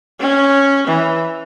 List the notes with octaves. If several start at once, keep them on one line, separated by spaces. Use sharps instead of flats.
C#4
E3